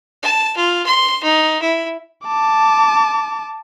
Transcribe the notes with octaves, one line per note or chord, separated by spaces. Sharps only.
A5
F4
C6
D#4
E4
A5 D6